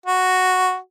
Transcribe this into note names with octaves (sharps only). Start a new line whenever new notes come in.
F#4